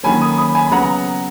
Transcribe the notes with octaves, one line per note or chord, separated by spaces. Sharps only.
D#3 F#3 A#3 C#4 G#5 B5
B5 D#6
B5 D#6
G#5 B5
B5
C#3 F#3 B3 F#5 A#5